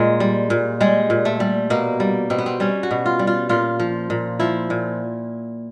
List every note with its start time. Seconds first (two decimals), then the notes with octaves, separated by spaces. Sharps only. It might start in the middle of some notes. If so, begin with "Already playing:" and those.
Already playing: A#2 G#3
0.20 G3
0.50 A#2
0.80 G3 G#3
1.10 A#2
1.25 A3
1.40 G3
1.70 B2 A#3
2.00 G3
2.30 B2 C4
2.38 B3
2.46 C4
2.60 G3 C#4
2.83 F#4
2.91 B2
3.06 F4
3.19 G3
3.27 F4
3.49 A#2 F4
3.80 F3
4.10 A#2
4.40 F3 E4
4.70 A#2